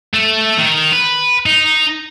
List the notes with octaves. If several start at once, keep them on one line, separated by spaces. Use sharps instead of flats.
A3
D#3
B4
D#4